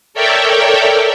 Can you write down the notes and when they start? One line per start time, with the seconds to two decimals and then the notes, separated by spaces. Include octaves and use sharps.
0.14 A4 A#4 C#5 D5 E5 G5